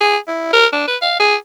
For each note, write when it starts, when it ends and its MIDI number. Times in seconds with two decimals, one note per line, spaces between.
0.01 0.17 68
0.28 0.51 64
0.53 0.66 70
0.72 0.83 62
0.88 0.96 71
1.02 1.15 77
1.19 1.35 68